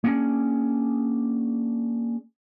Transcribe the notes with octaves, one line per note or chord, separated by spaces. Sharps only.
A#3 C#4 D4 G#4